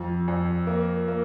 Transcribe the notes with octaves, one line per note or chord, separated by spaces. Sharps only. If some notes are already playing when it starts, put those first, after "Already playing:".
Already playing: F2
F2
A#3
A#3